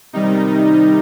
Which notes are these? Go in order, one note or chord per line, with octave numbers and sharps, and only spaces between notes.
C3 D#3 G3 D#4